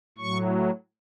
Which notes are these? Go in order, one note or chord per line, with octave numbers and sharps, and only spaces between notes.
A2 F#3 C#6